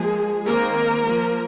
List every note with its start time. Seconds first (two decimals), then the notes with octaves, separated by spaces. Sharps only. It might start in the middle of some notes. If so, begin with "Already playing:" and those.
Already playing: F3 G#3 A#3 G#4
0.46 D#3 A#3 C4 A#4
1.05 F3 A#3